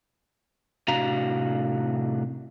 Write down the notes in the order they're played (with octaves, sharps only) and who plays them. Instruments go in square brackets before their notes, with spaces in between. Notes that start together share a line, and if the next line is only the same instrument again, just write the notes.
[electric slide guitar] A2 C3 D4 F#4 F5 A#5